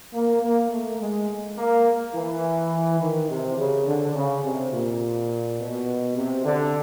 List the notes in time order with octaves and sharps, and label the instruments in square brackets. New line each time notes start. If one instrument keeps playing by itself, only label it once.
[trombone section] A#3
A#3
A3
G#3
A#3
E3
D#3
C3
C#3
D3
C#3
C3
A#2
B2
C3
D3